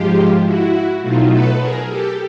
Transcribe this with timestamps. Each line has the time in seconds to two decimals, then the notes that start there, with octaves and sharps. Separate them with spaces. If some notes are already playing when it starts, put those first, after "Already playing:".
Already playing: G#2 F3 G#3 F4 G4
0.45 E4 F#4
1.02 B2 F#3 A3 D#4 F4
1.31 A4 B4
1.59 G#4 A#4
1.88 G4 A4